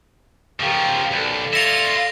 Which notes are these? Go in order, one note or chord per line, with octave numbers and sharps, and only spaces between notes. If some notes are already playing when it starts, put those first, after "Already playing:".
C#3 F3 G4 A#4
B1 A4 D5
E4 F4 A#6 C#7 F7